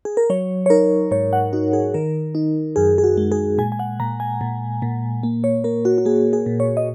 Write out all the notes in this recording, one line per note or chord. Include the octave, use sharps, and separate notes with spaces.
G#4
A#4
F#3 C#5
C#5
D#4 A#4
G#2 C#5
F#5
D#4 F#4
G#4
D#3 A#4
D#4
F#2 G#4
G#4
F#4
G#3
G#4
A#2 G#5
G#5
F#5
A#2 A#5
G#5
A#2
A#2
A#3
C#5
A#3 A#4
F#4
F#4
A#3 G#4
G#4
A#2
C#5
D#5